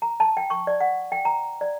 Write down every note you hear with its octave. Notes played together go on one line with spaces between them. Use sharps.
A#5
A5
G5
C#6
D5
F#5
G5
A#5
D5